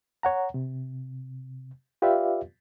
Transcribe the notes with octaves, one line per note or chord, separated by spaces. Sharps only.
C#5 F#5 A#5
C3
F4 G4 B4 D5 E5 F5